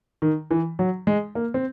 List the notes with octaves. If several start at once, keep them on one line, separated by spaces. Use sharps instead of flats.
D#3
E3
F#3
G#3
A#3
C4